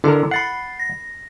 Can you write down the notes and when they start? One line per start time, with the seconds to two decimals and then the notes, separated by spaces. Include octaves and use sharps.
0.04 D3 E4 A4 A#4
0.31 F#5 B5 A6 C7
0.80 A#6